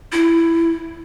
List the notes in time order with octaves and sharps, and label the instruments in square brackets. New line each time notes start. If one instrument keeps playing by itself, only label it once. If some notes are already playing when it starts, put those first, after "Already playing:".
[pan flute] E4